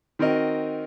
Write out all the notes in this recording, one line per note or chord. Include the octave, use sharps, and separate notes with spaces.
D#3 C4 F#4 A#4 D#5